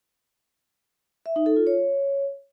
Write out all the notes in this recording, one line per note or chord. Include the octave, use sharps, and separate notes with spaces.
E5
D#4
A4
F4
C#5